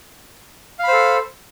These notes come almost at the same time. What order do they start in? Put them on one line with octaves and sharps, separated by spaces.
F5 B5 C5 A4